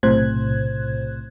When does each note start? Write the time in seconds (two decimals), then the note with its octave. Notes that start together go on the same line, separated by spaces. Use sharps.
0.03 B1 A2 C3 C5 F#6 G#6